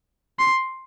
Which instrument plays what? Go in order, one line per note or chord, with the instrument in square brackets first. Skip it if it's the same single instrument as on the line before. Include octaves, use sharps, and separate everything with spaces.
[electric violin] C6